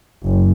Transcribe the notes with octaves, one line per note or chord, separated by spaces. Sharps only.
F#1